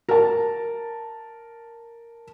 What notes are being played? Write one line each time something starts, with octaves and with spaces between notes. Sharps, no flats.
A#4 A5